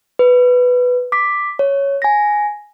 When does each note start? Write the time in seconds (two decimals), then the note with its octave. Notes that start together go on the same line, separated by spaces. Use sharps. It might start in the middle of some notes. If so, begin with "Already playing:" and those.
0.19 B4
1.12 D6 B6
1.59 C#5
2.02 G#5 A#6